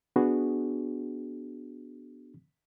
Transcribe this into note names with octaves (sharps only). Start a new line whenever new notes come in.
B3 D4 F#4 G#4